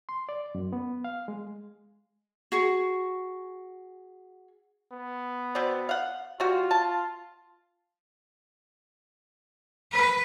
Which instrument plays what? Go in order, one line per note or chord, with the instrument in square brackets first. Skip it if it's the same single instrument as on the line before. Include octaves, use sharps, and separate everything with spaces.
[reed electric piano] C6
D5
F#2
B3
F5
G#3
[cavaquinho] F#4 G#4 C#6
[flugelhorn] B3
[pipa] B2 C4 D5
F5 F#5
[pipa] G3 F#4 [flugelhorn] F4
[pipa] A5
[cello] B4